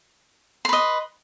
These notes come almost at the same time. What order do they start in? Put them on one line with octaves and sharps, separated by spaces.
C6 B4 D#5